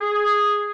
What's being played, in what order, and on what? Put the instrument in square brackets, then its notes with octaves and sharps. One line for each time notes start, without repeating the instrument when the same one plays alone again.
[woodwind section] G#4